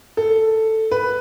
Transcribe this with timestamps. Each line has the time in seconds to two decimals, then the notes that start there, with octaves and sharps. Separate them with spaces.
0.17 A4
0.91 B4